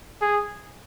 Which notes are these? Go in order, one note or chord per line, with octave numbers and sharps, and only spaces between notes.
G#4